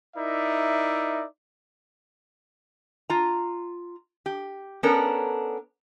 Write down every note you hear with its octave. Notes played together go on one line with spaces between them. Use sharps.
D#4 E4 A#4 D5 E5
F4 A#5
G4
B3 C#4 D4 A4 A#4